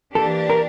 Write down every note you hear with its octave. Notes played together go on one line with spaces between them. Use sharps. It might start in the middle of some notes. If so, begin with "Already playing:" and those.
E3 A#3 D4 G4 A4
A#4